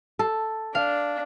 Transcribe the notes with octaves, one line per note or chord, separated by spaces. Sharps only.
A4
D4 F5